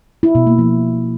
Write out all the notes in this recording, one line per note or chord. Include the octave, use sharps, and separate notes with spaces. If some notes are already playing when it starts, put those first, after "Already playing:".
E4
B2
A#3
F3